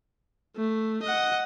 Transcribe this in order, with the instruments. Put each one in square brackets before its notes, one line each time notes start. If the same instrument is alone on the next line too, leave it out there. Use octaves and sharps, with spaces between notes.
[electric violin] A3
D#5 F#5